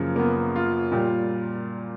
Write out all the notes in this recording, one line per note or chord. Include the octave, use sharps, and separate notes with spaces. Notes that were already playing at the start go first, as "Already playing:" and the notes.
Already playing: F#2 C#3 F3 A#3
A#3
B3
F4
A#2 G3